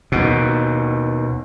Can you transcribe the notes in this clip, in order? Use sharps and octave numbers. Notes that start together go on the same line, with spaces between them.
D#2 B2